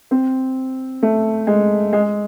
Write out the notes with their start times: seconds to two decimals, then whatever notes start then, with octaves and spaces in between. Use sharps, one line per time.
0.11 C4
1.03 A3
1.47 G#3
1.93 G#3